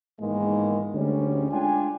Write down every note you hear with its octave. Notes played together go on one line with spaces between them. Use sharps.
G#2 D#3 E3 G#3 A#3 B3
D2 G#2 G3 C#4
G#3 D4 F4 G5 G#5